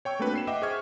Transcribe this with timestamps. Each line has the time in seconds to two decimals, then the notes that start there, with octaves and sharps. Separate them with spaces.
0.05 C#5 G5 C#6 E6
0.19 A3 A#3 C4 D4 F#4 B4
0.33 G5 C7 E7
0.47 D#5 E5 F#5 G5 D6
0.62 G#4 C5 E5 C#6 F6 G#6